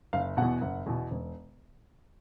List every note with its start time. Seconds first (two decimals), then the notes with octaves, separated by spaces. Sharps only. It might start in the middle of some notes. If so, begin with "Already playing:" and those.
0.13 F#1 F5
0.37 E2 B2 F#5
0.61 F#1
0.86 E2 B2
1.11 E1